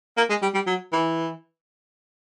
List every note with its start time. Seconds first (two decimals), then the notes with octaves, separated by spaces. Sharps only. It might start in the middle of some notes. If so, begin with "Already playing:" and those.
0.17 A#3
0.29 G#3
0.42 G3
0.54 G3
0.67 F#3
0.92 E3